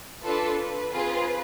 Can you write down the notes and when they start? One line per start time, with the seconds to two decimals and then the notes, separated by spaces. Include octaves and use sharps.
0.23 D4 F4 A4 B4
0.58 B4
0.93 C4 F4 G#4